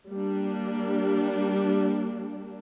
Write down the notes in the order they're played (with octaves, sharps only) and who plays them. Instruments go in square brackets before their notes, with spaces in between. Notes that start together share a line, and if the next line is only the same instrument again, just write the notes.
[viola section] G3 A#3 D4